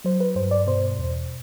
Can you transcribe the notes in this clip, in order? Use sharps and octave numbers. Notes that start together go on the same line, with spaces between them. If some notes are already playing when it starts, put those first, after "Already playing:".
F#3 C5
B4
G2 C5
D5
B2 C5
E2